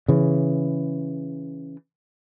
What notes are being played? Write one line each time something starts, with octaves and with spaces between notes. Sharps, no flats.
C#3 E3